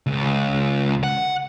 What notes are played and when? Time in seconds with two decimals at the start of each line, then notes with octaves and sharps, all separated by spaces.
0.06 C#2
1.03 F#5